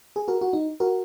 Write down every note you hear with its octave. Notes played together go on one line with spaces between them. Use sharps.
G#4
F#4 A#4
F#4
D#4
F#4 A#4